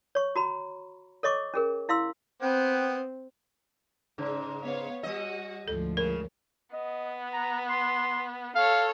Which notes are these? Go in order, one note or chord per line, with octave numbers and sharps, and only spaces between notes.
C#5 C#6
F#4 A#5 B5
A4 C#5 D#5 C#6 D6
C#4 G#4 A#4
E4 F5 C6 E6
B3 C4 B4 G5
G#2 C#3
B3 C#5 F5
G3 F#4 D#5 F#5
D2 G#2 F3 A4
C#3 A#4
B3 D#5
A#5
C6
A4 C#5 F5